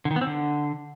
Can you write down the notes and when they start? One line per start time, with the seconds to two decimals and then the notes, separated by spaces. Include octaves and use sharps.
0.05 D3
0.11 D#3
0.16 B3
0.21 C4
0.27 D3